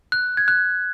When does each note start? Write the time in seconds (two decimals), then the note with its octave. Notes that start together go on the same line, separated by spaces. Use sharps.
0.12 F#6
0.37 G#6
0.48 F#6